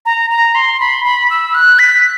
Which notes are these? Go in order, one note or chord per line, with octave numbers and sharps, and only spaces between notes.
A#5
A#5
C6
B5
B5
E6
F#6
B6